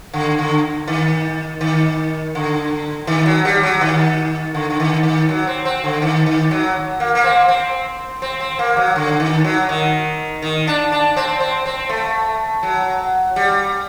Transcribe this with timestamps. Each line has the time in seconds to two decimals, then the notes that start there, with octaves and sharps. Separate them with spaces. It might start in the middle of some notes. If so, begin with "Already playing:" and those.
0.13 D3
0.39 D3
0.87 D#3
1.61 D#3
2.35 D3
3.07 D#3
3.26 F#3
3.45 G3
3.63 F#3
3.81 D#3
4.54 D3
4.70 D3
4.80 D#3
5.03 D#3
5.29 F#3
5.47 C4
5.65 C4
5.84 D3
6.02 D#3
6.26 D#3
6.51 F#3
7.00 A#3
7.15 A#3
7.24 C4
7.48 C4
8.22 C4
8.40 C4
8.59 A#3
8.77 F#3
8.96 D3
9.20 D#3
9.44 F#3
9.69 D#3
10.42 D#3
10.67 D4
10.92 D4
11.16 C4
11.40 C4
11.66 C4
11.89 A3
12.63 F#3
13.36 G3